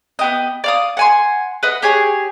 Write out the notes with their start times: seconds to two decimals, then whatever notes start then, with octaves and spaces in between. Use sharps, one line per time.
0.19 B3 G4 D#5
0.64 D5 F5 D#6
0.97 F#5 G#5 C6
1.63 B4 D#5 F#5
1.82 G4 G#4 C#5 G#5